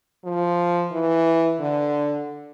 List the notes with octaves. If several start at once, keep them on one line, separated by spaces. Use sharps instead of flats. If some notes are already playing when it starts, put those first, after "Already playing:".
F3
E3
D3